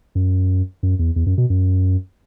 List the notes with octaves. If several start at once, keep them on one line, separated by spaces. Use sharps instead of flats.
F#2
F#2
E2
E2
F#2
B2
F#2